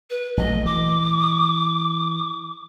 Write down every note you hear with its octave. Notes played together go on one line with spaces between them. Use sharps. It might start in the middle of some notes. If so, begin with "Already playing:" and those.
B4
A#1 F#3 A3 D#5
E3 D6